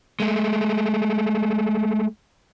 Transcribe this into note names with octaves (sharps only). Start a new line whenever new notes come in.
G#3 A3